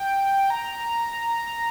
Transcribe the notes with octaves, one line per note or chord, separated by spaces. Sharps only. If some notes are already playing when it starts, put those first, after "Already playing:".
Already playing: G5
A#5